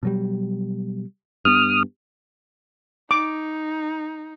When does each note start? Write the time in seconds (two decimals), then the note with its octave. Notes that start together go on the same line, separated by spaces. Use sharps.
0.03 B2 F#3 G3
1.45 G2 B3 D#6 F6
3.11 D#4 D6